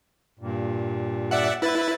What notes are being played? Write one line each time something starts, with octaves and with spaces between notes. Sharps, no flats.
G2 A#2
D5 E5 F#5
E4 B4 A6